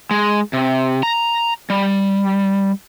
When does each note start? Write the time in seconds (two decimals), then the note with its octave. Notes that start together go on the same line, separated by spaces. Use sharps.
0.11 G#3
0.53 C3
1.03 A#5
1.70 G3